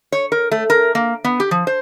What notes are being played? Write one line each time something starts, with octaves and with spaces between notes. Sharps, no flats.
C#5
A#4
A3
A#4
A#3
B3
G4
F3
C5